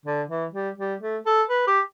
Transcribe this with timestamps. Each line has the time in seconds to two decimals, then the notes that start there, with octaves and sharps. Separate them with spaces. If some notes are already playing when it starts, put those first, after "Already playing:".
0.06 D3
0.29 E3
0.53 G3
0.78 G3
1.01 A3
1.26 A4
1.50 B4
1.67 G4